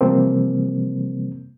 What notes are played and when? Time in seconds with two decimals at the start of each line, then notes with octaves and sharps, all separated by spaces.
0.01 C3 E3 F3 G3 A#3 C4